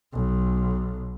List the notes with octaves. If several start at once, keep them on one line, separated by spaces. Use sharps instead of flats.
B1